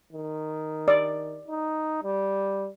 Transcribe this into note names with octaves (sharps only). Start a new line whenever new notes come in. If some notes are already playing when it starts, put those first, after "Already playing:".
D#3
D5
D#4
G3